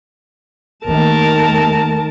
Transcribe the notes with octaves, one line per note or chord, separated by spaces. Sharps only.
D#2 D#3 A3 A#4 A5